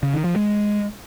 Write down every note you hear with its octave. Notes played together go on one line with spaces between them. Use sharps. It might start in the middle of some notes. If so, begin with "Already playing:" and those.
C#3
D#3
F3
G#3